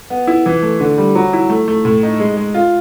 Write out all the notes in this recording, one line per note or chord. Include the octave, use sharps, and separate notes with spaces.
B3
E4
E3
A3
D3
G3
F#3
E4
A3
A3
A2
D#4
G#3
G#3
F4